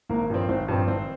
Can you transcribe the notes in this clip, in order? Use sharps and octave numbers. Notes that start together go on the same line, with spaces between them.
G#1 A#3 A#4
G2 F3 C4
G#1 C4 C5
G2 F3 C4
G#1 C4 C5